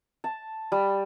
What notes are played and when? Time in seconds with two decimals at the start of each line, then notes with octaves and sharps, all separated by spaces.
0.24 A5
0.72 G3